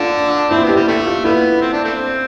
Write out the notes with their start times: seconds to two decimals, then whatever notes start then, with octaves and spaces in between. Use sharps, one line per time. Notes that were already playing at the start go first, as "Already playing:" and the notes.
Already playing: D3 D4 F4
0.51 C4 E4
0.63 B3
0.69 G4
0.76 G3
0.88 D3 A3
1.06 F4
1.24 G3 B3 E4
1.62 C4
1.73 D4
1.84 A3 C4